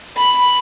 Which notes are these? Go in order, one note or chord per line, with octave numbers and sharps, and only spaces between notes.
B5